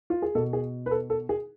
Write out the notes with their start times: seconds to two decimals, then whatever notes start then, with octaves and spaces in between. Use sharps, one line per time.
0.10 F4
0.22 G#4
0.35 B2 A4
0.53 G#4
0.86 B4
0.91 A4
1.10 A4
1.29 G#4